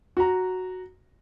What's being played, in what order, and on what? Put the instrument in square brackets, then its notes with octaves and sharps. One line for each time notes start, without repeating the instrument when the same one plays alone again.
[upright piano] F#4 A#5